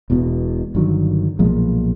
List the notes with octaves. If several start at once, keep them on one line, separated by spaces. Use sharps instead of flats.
E1 E2 B2
G1 G2 D#3 F#3
B1 A#2 F3 G#3